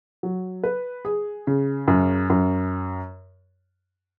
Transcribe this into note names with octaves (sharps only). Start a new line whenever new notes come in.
F#3
B4
G#4
C#3
F#2
F#2